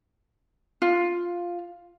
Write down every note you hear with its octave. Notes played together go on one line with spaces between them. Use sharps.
F4